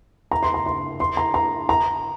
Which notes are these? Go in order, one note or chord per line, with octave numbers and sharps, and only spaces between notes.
A#5
C6
A#5
C6
C6
A#5
A#5
A#5